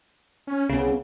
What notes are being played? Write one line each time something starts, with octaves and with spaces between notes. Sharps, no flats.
C#4
C2 C#3 B3